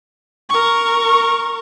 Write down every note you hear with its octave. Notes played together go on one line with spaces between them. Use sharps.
A#4 C#6